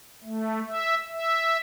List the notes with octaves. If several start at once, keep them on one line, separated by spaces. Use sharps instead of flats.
A3
E5
E5